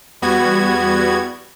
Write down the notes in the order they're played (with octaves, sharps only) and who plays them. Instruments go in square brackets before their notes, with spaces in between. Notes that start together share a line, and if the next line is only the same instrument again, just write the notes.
[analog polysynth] E2 G3 B3 F#4 G#6